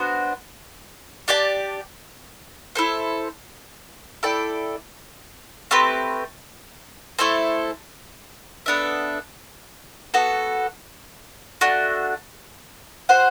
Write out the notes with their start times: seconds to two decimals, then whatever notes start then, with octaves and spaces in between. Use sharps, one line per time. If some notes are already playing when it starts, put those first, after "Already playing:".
Already playing: B3 D4 F#4 C5
1.28 D4 G4 D5 A5
2.75 E4 A4 C5
4.23 E4 A4 D5 G5
5.71 A3 C4 G4 B4
7.19 A3 E4 A4 C5
8.66 B3 D4 A4 E5
10.14 B3 F#4 A4
11.61 A3 D4 F#4
13.09 F#4 C5 F#5